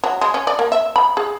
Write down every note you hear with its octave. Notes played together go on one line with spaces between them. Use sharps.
F#3
G#3
C#4
D5
A#3
E5
B5
G#4